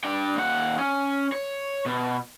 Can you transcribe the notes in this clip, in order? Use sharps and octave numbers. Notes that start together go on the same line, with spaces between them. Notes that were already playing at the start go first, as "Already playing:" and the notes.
D4 G5
D#2 F#5
C#4
C#5
B2